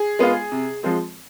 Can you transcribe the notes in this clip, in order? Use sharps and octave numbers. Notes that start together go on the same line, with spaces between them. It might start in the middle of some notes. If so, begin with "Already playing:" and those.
Already playing: G#4
G#3 B3 F4
C3
F3 G#3 C4